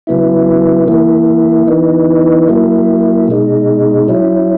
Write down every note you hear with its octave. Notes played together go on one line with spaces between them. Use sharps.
C#3 F#3 B3 E4
E3 A#3 E4
E3 B3 D#4
F#3 A#3 E4
B2 G#3 D#4
F#3 C#4 E4